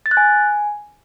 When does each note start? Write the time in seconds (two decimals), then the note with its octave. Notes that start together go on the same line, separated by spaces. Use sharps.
0.06 A6
0.11 F#6
0.17 G#5